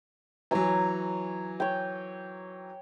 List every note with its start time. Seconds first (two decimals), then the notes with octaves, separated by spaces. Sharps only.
0.51 E3 F#3 C#5 G#5 A#5
1.60 C#5 G5